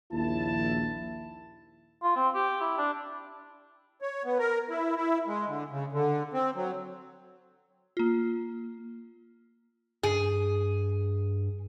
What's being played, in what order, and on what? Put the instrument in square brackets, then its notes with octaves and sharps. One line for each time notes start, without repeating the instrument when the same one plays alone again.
[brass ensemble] A#1 D#2 E4 A5
[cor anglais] F4
C4
G4
E4
D4
[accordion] C#5
B3
A#4
E4
E4
G#3
D3
C#3
D3
C4
F#3
[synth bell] A#3 F4
[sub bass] G2 [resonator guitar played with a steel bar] G#4